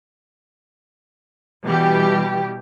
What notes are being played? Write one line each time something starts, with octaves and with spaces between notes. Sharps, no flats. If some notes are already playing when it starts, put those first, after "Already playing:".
B2 E3 G3 G4